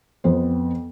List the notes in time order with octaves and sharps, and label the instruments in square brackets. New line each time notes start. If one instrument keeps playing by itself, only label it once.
[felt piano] F2 B3 C5